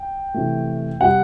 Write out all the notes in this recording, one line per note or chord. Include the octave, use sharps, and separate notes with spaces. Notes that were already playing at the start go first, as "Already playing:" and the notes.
Already playing: G5
C3 E3 A3
C3 G3 F#5